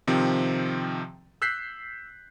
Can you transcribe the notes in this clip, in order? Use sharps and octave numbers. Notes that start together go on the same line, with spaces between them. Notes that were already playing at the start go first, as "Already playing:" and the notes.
C3 D#3 F3 C4
E6 F#6 G6 B6 C7